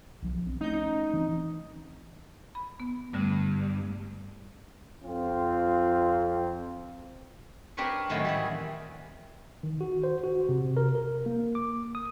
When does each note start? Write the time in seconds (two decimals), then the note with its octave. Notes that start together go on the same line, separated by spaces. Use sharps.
0.22 B1 F3
0.47 C4
0.61 A3 C#4 D#4 G6
0.73 D#4
1.13 E3 C4
2.55 B5
2.80 B3
3.13 G2 D3 G3 A3
5.04 F2 C4 F4
7.77 C4 D4 G4 A#4 B4 C#5
8.09 A2 D#3 E3 F#3 C4 E4
8.25 G3 E4 G#4
9.63 D#3
9.81 F#4
10.04 C5
10.23 F#4
10.49 C3
10.77 A#4
10.95 A#4
11.26 A#3
11.55 D6
11.95 D#6